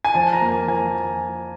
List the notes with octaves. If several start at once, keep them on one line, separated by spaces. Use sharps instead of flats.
G#5
F2 A5
A#5
A#3
F2 G#5